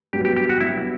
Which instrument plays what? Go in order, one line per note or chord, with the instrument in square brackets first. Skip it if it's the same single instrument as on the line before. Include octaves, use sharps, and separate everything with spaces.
[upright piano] G2 F#3 B3 [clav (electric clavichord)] G4
[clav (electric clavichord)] G4
G4
F#4
[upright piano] G2 F#3 B3 [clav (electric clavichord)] E4